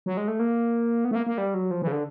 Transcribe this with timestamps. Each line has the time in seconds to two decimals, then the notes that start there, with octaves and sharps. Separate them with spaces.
0.06 F#3
0.17 G#3
0.28 A3
0.39 A#3
1.05 B3
1.11 A3
1.15 A#3
1.26 A#3
1.38 G3
1.54 F#3
1.71 F3
1.82 E3
1.87 C#3
1.92 D3